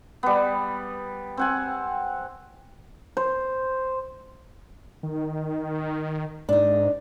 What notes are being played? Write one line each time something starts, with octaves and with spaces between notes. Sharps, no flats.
G3 B3
C4 F#5 G#5
C5
D#3
G#2 D4 D#4